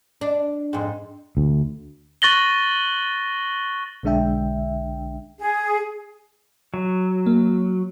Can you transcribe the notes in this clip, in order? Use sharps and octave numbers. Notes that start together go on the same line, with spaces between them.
D4
F2 G#2
D2
C#6 F#6 A6 A#6 F#7 G7
B1 D3 G#3 D4 E5 G5
G#4
F#3
A#3